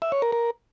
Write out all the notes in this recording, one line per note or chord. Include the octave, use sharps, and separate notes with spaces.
E5
C#5
A#4
A#4